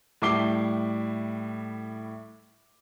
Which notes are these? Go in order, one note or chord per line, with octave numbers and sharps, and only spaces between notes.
A2 G3 E4 D6 C7 G7